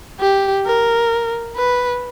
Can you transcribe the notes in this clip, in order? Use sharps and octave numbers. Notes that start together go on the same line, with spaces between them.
G4
A#4
B4